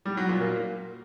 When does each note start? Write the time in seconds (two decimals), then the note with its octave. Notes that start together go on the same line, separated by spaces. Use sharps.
0.06 G3
0.17 F#3
0.29 A#2
0.41 A#3